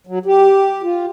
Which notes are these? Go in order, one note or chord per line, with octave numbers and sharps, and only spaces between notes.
F#3
G4
F4